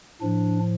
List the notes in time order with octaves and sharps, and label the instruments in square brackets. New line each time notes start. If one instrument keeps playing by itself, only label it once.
[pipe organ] A2 F3 D4